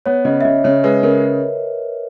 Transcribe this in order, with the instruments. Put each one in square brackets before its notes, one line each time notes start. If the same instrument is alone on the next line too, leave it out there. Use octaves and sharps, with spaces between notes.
[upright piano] B3 [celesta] C#5
[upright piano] C#3 [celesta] D#5
[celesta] E5
[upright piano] C#3 [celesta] D#5
[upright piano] C#3 [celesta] C#5
[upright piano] G#3 [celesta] B4
[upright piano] C#3 [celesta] A#4